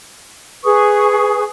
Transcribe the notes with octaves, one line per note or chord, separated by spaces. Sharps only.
G#4 B4 C#6 D#6